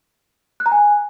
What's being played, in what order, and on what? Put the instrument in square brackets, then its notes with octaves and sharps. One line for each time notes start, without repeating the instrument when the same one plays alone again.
[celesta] F#6
A#5
G#5